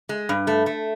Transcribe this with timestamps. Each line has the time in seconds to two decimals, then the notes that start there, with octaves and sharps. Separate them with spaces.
0.09 G#3
0.29 G2
0.47 A3
0.66 A3